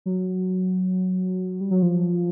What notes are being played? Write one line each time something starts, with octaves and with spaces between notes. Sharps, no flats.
F#3
G3
F#3
F3